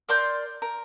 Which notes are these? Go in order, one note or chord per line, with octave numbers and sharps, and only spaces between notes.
A#4 D5 C6 G6
A#4